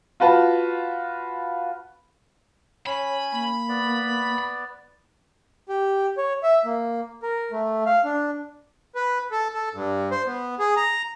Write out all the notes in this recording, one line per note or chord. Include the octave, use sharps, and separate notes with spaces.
F4 F#4 B4 A5
C#4 C#5 G#5 B5
A#3
B3 D5
G4
C#5
E5
A#3
A#4
A3
F5
D4
B4
A4
A4
G2
C5
B3
G#4
A#5